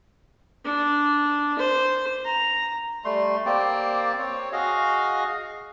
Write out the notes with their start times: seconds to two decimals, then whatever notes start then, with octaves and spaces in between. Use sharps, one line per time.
0.65 D4
1.59 C5
2.25 A#5
3.05 G3 A3 C6
3.46 A#3 C4 G4 D5
4.19 C4 C#5
4.52 F#4 G#4 D#5 F5